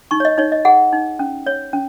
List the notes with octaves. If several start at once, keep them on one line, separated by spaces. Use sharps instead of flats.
D#4 C#6
C#5
D#5
D#4 C#5
D#5
G#4 F#5
D#4
C#4
C#5
C#4